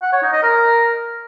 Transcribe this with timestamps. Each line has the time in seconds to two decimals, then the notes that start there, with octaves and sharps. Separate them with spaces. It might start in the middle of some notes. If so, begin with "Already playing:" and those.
0.02 F#5
0.12 C#5
0.23 D#4
0.33 D#5
0.43 A#4